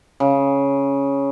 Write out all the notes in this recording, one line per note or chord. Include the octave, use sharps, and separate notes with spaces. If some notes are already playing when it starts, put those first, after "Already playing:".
C#3